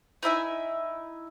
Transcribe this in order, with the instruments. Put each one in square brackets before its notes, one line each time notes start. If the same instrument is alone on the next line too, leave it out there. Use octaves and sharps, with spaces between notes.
[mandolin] D#4 E4 E5 G#5